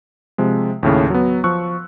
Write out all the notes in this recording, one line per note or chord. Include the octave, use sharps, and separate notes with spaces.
C3 F3 G#3
D#2 A2 C#3
F#3 B3
F3 C#6 E6 F#6